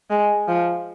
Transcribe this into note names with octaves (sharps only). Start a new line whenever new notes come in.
G#3
F3